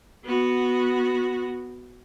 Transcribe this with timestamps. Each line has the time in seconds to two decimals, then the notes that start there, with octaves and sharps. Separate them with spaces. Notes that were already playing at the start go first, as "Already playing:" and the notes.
0.24 B3 F#4